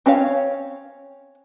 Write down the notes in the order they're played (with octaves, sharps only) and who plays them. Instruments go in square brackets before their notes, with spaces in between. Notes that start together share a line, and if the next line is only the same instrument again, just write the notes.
[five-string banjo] C4 C#4 C#5 F5